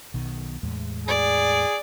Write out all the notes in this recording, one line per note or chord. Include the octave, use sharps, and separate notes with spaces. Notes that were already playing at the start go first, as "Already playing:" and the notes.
B1 B2 D#3
E2 A2 G#3
G#4 D5